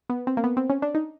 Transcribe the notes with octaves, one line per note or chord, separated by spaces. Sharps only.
B3
C4
A#3
B3
C4
C#4
D4
D#4